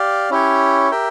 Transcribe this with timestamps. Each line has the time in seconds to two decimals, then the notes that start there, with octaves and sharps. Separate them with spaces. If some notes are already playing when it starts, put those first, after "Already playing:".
Already playing: G4 D5 F5
0.30 C#4 E4 G4 C#5
0.91 G4 A#4 E5 G5